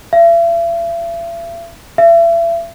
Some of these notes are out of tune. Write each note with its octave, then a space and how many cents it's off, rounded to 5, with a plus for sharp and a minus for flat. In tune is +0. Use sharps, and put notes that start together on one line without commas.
E5 +45
E5 +35